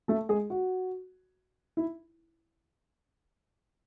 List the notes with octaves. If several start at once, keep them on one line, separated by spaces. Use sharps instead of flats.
A3 A4
G#3 G#4
F#4
E4